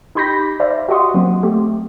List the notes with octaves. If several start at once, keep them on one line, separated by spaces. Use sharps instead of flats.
D#4 G4 B5 G6 A#6 B6
C5 D5 E5 F5
F#4 G4 D#5 F#5 C6 D#6
F#3 A#3 C4
A3 C4 G4